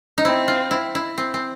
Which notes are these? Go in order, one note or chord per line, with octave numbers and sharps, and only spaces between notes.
D#4
C4 E4
F4
E4
E4
C4
C4